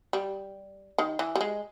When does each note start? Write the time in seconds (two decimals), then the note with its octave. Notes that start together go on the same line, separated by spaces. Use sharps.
0.13 G3
0.98 D#3
1.19 E3
1.35 G3
1.41 G#3